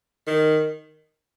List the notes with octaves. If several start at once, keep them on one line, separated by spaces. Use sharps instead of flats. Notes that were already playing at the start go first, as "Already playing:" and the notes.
D#3